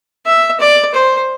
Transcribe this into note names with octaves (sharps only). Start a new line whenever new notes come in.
E5
D5
C5